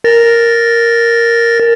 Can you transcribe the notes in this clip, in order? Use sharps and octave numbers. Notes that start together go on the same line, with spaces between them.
A#4 A6 A#6